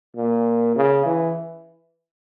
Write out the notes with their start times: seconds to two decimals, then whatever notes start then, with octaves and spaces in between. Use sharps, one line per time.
0.16 A#2
0.76 C#3
1.05 E3